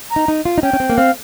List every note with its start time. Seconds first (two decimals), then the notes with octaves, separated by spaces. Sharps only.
0.11 A#5
0.16 D#4
0.28 D#4
0.45 F4
0.58 D#4
0.62 C#4 G5
0.73 C#4
0.80 C4
0.90 A#3
0.97 C4 F5